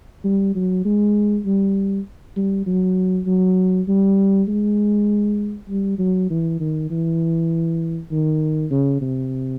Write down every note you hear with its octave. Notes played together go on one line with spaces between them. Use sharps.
G3
F#3
G#3
G3
G3
F#3
F#3
G3
G#3
G3
F#3
E3
D#3
E3
D#3
C#3
C3